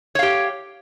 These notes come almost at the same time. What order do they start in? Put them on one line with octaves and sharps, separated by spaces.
C#5 F5 G4